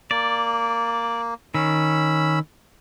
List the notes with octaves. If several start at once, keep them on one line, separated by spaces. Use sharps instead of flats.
A#3 D5
D#3 C#4 B5 E6